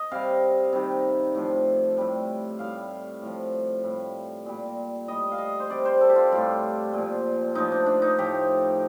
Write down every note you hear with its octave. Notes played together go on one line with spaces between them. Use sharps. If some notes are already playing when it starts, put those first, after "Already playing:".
Already playing: D#5
C3 G3 F5
C3 D#3 G3
A2 F3
A2 G3
A2 G3 F5
A2 F3
A2 G3
A#2 G3
A2 G3 D#5
F5
D#5
C5
C3 G3 D5
C5
A4
G4
F4
A2 G3 F4
A#2 F3
A2 F3 D#4
D4
D4
D#4
A2 F3 G4